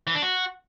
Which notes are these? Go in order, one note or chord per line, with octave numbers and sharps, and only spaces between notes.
E3
D4
F#4